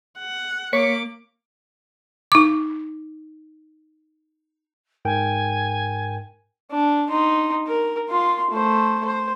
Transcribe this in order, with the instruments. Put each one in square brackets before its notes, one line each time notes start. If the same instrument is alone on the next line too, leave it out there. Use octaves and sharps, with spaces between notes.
[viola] F#5
[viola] A#3 D6 [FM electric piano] C#5 B6 C#7
[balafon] D#4 D6
[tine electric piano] G#2 A#4 G5 [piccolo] G#5
[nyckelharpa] D4
D#4 C6
A#4
F4 C6
A3 C5
C5